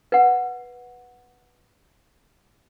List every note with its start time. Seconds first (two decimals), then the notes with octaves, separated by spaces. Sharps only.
0.12 B4 F#5